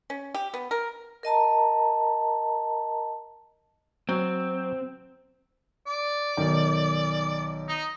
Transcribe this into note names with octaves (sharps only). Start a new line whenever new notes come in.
C#4
G4
B3
A#4
A#4 D#5 A5 A#5
F#3 C4
D5
B1 D#3 D6
D#4